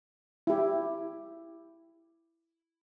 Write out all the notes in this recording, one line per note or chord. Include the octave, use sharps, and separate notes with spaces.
E4 G4